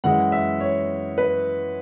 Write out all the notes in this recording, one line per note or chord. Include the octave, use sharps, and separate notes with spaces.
F#2 E3 G#3 F#5
E5
C#5
B4